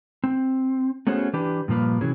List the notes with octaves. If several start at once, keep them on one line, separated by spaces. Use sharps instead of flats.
C4
A3 B3 C#4 F#4 G#4 C5
E3 D4 G4 B4
G2 A#2 F3 A#3 B4
C3 E3 F#3 C#4 E4 G#4